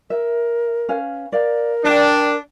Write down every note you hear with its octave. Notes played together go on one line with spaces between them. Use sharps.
A#4 E5
C#4 B4 F5
A#4 D5 F5
D4 D5 G5